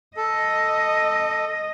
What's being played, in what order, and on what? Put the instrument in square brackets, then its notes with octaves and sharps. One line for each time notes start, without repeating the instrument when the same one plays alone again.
[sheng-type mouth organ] A4 [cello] D#5